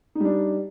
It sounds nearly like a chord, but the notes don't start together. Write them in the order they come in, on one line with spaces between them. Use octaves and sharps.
D#4 G3 D4